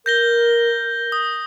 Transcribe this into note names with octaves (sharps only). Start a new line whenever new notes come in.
A#4 G6 A#6 G7
D#6